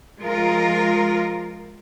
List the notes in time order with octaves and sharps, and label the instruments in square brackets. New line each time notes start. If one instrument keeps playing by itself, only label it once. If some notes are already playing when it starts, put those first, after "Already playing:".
[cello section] F3 G#3 F4 A#4